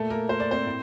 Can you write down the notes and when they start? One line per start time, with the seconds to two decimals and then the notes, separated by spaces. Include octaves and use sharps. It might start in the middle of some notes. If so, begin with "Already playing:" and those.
Already playing: A#2 A3 A4
0.10 A#3 A#4
0.29 C5
0.40 D5
0.51 C4 C5
0.66 A2